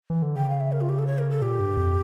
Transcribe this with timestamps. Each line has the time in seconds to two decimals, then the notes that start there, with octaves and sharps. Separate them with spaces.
0.10 E3
0.22 D3
0.36 C#3 G5
0.50 F5
0.60 E5
0.72 A#4
0.81 F4
0.89 G4
0.99 A4
1.07 C#5
1.19 A#4
1.30 A4
1.42 A#2 G4
1.60 G2
1.77 F2